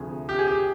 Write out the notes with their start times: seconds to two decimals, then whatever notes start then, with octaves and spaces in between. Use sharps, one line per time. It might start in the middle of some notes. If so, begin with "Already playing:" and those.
Already playing: D2 C3 F3 A3 G#4
0.29 G4
0.39 G#4
0.47 G4